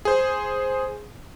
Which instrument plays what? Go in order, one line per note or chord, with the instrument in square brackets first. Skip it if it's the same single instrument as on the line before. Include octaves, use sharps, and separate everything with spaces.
[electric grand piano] G#4 C5